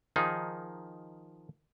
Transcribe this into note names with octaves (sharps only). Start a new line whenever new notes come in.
D#3 F3 D#4 G#4